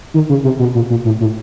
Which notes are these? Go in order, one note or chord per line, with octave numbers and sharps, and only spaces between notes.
D#3
C#3
C3
B2
A#2
A#2
A2
A2